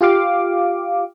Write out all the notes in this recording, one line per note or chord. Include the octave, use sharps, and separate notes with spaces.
F4 G4 F5 D6